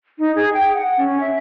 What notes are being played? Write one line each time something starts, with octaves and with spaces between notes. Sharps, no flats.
D#4
G#4
G5
F#5
C#4
E5